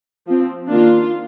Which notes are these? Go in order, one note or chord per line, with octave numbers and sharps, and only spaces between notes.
F3 C4
D#3 A#3 D4 F4